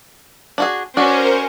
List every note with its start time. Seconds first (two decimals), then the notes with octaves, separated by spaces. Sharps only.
0.58 D4 F#4 G#4
0.97 C#4 D4 F#4 A#4 C5